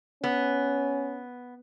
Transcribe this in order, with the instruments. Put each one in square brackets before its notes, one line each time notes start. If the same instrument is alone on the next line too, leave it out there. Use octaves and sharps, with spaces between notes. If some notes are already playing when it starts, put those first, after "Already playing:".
[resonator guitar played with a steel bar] B3 [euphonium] C#4